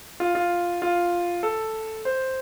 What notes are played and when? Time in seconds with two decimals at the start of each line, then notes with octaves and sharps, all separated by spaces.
0.20 F4
0.35 F4
0.82 F4
1.43 A4
2.05 C5